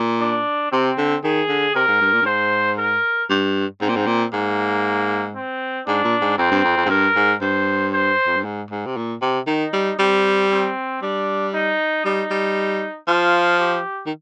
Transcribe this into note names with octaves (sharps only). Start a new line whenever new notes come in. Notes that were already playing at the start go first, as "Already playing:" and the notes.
Already playing: A#2
D4
C3 C4
D3
D#3 G#4
D3
C3 A#4
G#2
G2
A#2
G2
G#2 C5
A#4
G2
G#2 C4
A#2
G#2
A#2
G#2 A#3
C4
G#2 D4
A#2
G#2
F2 C4
G2
F2
F2
G#2
G2 A#4
G#2
G2 C5
C5
F2
G2
G#2
G#2
C3
A#2
C3
D#3 D#4
G3
G3 C4
C4
G3 D4
D#4
G3 D#4
G3
F3 F4
G4
D#3